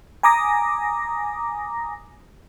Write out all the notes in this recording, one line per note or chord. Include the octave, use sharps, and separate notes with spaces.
G#5 A#5 D6 D#6 A#6